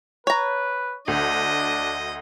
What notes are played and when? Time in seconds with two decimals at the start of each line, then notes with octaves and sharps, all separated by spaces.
0.27 B4 C#5 A#5
1.08 D2 D4 D#5